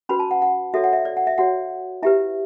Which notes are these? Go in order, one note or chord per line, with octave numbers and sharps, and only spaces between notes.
C#4 F#4 B4 B5
A5
F#5
F#5
F#4 A4 C#5 E5
F#5
E5
D5
F#5
E5
F#4 C#5 F#5
E4 G4 B4 E5